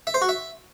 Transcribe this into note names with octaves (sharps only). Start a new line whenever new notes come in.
E5
C5
F#4
E5